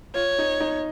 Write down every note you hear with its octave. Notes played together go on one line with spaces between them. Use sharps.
F4 C#5
D#4
D#4